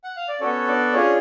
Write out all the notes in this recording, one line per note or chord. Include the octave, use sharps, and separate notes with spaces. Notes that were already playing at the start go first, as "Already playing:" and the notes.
F#5
F5
D5
B3 C#4 F#4 A4 C#5
D4 D5
C#4 D4 F4 G#4 C#5